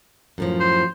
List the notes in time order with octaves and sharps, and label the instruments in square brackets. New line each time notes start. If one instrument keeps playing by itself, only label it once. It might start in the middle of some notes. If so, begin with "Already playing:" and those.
[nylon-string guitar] F#2 A2 F3
[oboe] C5